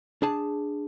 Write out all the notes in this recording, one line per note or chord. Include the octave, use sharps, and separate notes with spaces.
D4 G#4 A5